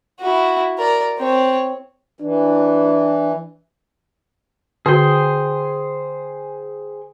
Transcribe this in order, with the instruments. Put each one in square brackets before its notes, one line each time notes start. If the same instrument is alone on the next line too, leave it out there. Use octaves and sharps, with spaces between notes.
[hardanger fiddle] E4 F#4
A#4 D5
C4 C#5
[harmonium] E3 [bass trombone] D4
[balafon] D3 F#4 [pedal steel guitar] G#4 C5 G5